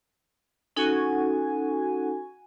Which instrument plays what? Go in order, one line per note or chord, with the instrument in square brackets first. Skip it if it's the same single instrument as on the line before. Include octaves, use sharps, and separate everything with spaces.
[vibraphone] C#4 D#4 A4 [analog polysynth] F#4 G#5